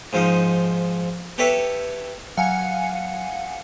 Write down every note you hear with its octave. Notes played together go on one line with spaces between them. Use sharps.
G#2 F3 D#4
G4 A4 B4 C#5 E5
F#3 F5 F#5 G#5 C#7